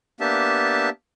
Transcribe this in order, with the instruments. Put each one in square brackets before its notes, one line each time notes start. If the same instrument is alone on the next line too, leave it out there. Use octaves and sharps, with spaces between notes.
[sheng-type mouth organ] A#3 B3 D4 G4 E5 A5